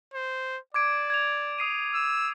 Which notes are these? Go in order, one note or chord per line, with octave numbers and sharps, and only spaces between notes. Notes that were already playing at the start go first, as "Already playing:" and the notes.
C5
D5 D6 G#6 D7
G#6 F7
D#6 C7 D#7
E6